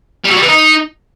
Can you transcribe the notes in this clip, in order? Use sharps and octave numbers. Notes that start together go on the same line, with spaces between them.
G3
F#3
G3
E3
D#4